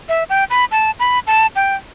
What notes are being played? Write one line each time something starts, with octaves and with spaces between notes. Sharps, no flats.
E5
G5
B5
A5
B5
A5
G5